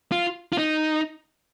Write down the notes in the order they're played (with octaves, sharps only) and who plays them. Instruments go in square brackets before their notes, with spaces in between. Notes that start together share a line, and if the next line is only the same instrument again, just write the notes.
[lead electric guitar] F4
F4
D#4